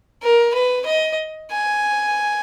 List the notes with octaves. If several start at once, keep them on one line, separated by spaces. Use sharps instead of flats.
A#4
B4
D#5
G#5